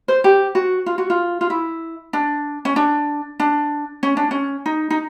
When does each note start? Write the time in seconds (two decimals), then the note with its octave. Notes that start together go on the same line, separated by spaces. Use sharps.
0.08 C5
0.24 G4
0.55 F#4
0.86 F4
0.98 F#4
1.10 F4
1.41 F4
1.50 E4
2.13 D4
2.65 C#4
2.76 D4
3.40 D4
4.03 C#4
4.17 D4
4.31 C#4
4.66 D#4
4.90 D#4